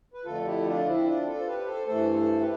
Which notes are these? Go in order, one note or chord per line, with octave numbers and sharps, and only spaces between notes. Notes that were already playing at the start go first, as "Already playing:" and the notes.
B4
F2 D3 A3 F4 A4
E4 G4
D4 F4
C4 E4
D4 F4
F4 A4
C5
G4 B4
A4 C5
G2 E3 A3 A4 C5
A4 C5
G4 B4